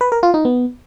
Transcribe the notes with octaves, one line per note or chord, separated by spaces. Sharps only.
B4
A#4
F4
D#4
B3